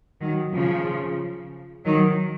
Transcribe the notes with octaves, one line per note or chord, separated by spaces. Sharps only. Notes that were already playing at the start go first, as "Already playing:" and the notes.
D#3 F#3
C#3 F3
D#3 F#3